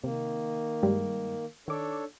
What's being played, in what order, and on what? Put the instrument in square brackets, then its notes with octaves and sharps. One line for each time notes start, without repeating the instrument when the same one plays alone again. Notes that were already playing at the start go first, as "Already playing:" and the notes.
[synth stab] C3 [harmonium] D#3 A#3
[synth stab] G2 G3 G#3
[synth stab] D#3 D6 [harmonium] D4 A4 C#5